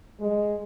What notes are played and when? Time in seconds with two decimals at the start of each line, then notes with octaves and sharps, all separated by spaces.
0.20 G#3